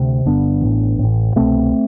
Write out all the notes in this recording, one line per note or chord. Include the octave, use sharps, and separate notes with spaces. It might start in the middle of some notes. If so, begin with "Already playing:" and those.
Already playing: D2 C3
G1 G2 D3 B3 D4
A1 A2
A1 A2
C2 B2 A3 C4